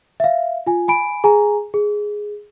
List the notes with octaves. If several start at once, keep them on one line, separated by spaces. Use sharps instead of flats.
E5 F5
F4 G#5
G#5 B5 D7
G#4 G#5 A#5
G#4